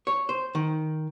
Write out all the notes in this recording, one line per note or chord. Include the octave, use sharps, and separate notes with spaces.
C#5
C5
D#3